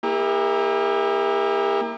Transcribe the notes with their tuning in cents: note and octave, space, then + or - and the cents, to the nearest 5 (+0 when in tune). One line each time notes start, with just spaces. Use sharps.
A#3 +0 E4 -20 G4 +45